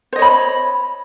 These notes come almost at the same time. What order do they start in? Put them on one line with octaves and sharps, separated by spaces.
C5 D#5 C#5 B5